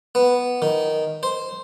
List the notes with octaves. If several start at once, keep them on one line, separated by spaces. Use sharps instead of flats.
B3
D#3
C5